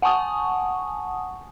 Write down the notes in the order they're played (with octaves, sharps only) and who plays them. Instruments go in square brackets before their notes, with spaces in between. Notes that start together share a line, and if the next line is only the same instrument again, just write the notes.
[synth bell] F#5 G#5 A5 C#6 D#6